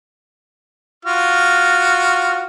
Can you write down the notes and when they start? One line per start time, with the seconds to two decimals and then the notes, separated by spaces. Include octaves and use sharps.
1.05 F4 F#4 F6